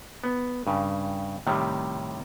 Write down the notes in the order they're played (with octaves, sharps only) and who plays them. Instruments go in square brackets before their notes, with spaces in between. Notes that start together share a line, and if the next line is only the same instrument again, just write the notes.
[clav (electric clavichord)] B3
G2 C#3
A2 C3 D#3 G3